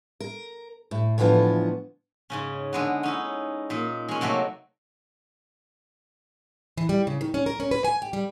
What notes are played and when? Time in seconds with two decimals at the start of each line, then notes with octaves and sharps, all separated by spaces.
0.20 A#4
0.91 A2
1.18 A2 D3 E3 F3 B3
2.30 G#2 C#3 C#4
2.73 D3 G#3 B3
3.03 C#4 D#4 E4
3.70 A#2 D#4
4.09 G#3 C#4
4.21 C3 F#3 A3 A#3
6.77 E3
6.89 G3
7.07 C#3
7.21 D#3
7.34 C#4
7.46 A#4
7.60 C#4
7.71 B4
7.84 G#5
8.02 G4
8.13 G3